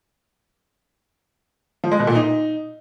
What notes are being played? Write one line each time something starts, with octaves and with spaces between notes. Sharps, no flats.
F3
G#3
B2
A#2
D#4